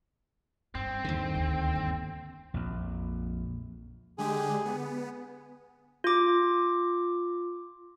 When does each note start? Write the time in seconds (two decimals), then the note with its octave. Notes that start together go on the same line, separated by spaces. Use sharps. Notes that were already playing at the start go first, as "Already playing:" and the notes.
0.75 G2 C4
1.04 D#2 D3
1.35 D2
1.75 G2
2.54 A#1 F2
4.18 D3 G#3 G4 G#4
4.65 B3
6.04 F4 D6